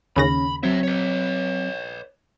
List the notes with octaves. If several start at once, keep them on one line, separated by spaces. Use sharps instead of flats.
D#2 C#3 C#4 B5 A#6
F#3 C4 C#5 E5
B4 C#5